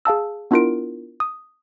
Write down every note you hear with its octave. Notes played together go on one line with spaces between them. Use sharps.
G#4 F5 A5 E6
B3 D4 E4 F4 A#4 D7
D#6